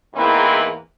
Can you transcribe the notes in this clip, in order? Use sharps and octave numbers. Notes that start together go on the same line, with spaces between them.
E2 G#2 E3 A#3 C4 E4